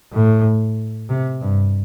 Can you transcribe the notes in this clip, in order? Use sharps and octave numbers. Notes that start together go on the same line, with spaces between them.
A2
C3
G2